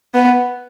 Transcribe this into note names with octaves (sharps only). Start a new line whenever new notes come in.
B3